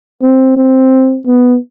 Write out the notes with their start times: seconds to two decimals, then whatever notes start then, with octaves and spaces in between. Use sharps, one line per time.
0.22 C4
0.57 C4
1.26 B3